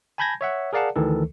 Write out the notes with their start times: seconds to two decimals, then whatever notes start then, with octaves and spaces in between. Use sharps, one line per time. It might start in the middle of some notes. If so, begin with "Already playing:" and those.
0.18 G#5 A5 B5 G6 G#6 A#6
0.41 C#5 E5 F#5
0.73 G#4 A#4 D5 F5 F#5 A5
0.96 D2 D#3 E3 A4